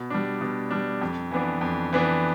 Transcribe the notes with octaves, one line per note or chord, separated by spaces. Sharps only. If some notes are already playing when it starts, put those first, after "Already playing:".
Already playing: B2
G3 D4
B2
G3 D4
F2
E3 B3 D4
F2
E3 B3 D4